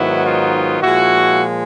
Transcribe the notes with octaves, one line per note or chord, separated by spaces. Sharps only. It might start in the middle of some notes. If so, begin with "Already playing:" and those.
Already playing: G#2 D#3 F#3 B3 E4
D#4 F4
A#2 F3 G#3 E4 F#4